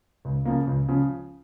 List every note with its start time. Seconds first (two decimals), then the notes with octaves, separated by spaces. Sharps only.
0.25 C#2
0.45 C#3 F3 A#3
0.67 C#2
0.89 C#3 F3